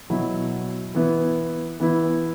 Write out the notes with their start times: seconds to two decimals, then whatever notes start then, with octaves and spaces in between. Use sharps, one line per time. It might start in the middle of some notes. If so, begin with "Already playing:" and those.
0.10 B2 F#3 E4
0.95 E3 B3 E4
1.80 E3 B3 E4